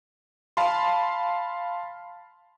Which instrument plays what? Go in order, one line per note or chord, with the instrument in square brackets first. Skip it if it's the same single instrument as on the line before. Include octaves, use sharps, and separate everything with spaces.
[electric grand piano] F5 A5 B5 C6